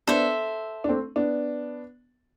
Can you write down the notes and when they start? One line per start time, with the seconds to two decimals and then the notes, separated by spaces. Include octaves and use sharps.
0.07 B3 D4 A4 C5 E5
0.84 D4
0.89 A3 C4
1.16 B3 D4